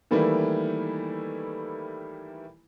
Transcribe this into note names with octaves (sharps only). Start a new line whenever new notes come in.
D#3 E3 G3 A3 A#3 E4